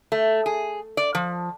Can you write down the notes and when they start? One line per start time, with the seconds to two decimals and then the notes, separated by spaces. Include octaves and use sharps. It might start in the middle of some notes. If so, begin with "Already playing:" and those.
0.12 A3
0.46 G#4
0.97 D5
1.15 F3